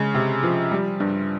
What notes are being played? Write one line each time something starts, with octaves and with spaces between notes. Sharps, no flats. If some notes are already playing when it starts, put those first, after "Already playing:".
Already playing: C#3 G#3
C3
F3
G3
G2